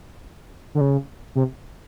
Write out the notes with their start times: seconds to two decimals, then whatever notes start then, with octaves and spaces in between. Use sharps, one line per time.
0.75 D3
0.81 C#3
1.35 C3